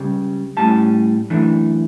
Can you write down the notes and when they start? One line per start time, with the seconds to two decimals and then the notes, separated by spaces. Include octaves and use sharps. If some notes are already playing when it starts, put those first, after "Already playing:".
Already playing: C#2 C#3 G3
0.57 A2 G3 C#4 A5
1.30 F#2 E3 A3 D4